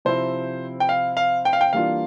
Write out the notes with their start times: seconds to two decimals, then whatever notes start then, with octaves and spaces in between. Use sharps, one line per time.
0.05 C3 F3 C4 E4 C5
0.80 G5
0.89 F5
1.17 F5
1.45 G5
1.53 F5
1.61 G5
1.73 E3 G3 A#3 D4 F4 F5